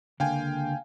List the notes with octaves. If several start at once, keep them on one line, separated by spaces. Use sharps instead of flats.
C#2 D3 A#3 F5 G5 G#5